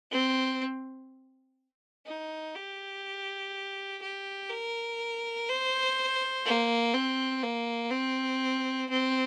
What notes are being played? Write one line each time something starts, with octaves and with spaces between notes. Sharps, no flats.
C4
D#4
G4
G4
A#4
C5
A#3
C4
A#3
C4
C4